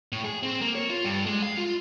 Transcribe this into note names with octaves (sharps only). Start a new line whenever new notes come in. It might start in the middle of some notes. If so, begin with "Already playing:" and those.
A2
G#4
C4
A#3
C#5
F4
G2
G#3
F5
F4